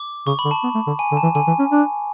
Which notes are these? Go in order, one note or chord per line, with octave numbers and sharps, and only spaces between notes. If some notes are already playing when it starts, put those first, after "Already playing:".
Already playing: D6
C#3 C#6
B5
D3
A5
B3
A3
D3
G#5
D3
A5
E3
D3 G#5
E3
C#4
D4